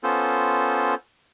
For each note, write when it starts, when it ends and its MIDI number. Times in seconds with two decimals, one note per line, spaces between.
0.03 0.95 59
0.03 0.95 61
0.03 0.95 65
0.03 0.95 69
0.03 0.95 72